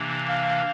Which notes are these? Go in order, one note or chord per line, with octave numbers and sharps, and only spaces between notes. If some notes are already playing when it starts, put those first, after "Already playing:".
Already playing: C3 E3 A#3 D4
F5